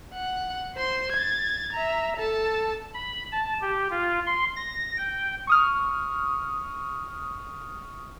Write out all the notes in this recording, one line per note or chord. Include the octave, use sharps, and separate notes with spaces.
F#5
C5 C6
G#6 A6
E5 A#5
A4 A5
B5
A5
G4
F4
C6
A#6
G5
C#6 D#6 F6